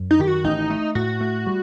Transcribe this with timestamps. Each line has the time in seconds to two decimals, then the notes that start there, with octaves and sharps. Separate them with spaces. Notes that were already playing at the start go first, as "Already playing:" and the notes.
Already playing: F#2
0.11 D#4
0.19 D#3 G4
0.27 F#4
0.44 A1 D#4
0.70 A3
0.95 A2 F#4
1.21 A3
1.47 G3